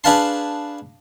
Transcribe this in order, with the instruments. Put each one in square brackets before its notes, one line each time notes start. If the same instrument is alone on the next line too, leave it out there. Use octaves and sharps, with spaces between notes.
[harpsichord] D4 G#4 B4 F5 A5 C6